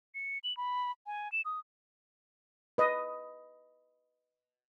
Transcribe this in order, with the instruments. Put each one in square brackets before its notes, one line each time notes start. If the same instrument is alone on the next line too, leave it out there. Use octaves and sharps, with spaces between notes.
[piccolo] C#7
F#7
B5
G#5
E7
D#6
[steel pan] B4 D#5